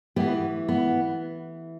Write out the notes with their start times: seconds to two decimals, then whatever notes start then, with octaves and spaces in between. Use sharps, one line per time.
0.16 E3 A3 B3 E4 G4
0.68 B3